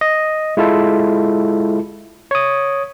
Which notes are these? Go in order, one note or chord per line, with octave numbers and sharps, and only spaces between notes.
D#5
G#3 E4 F4 A4
C#5 D#6